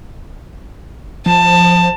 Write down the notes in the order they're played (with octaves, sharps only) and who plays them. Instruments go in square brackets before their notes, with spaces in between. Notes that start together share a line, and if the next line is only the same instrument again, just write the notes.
[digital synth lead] F3 [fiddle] A5